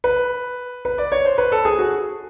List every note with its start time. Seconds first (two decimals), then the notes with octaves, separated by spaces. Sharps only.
0.04 B4
0.85 B4
0.98 D5
1.12 C#5
1.25 C5
1.38 B4
1.52 A4
1.65 G#4
1.79 F#4